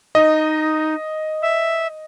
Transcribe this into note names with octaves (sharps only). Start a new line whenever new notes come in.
D#4 D#5
E5